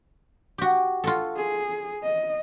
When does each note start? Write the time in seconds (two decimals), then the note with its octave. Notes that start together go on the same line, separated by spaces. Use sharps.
0.58 F#4 G4
1.04 F4 F#4 A4
1.37 G#4
2.03 D#5